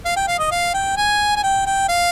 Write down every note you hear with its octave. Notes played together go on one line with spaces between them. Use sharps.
F5
G5
F5
D#5
F5
G5
G#5
G#5
G5
G5
F5